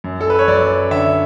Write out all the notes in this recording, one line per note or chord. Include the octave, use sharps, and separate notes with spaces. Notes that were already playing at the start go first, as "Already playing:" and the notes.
F#2
A4
B4
C#5
F#2 D5
D3 E5